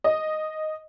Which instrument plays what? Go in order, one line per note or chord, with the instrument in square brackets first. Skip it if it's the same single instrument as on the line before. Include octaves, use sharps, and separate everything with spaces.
[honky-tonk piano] D#5